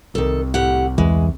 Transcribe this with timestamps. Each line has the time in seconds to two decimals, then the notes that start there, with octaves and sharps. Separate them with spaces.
0.15 C2 D#3 A4
0.54 A2 G4 F#5
0.98 E2 E3 G#3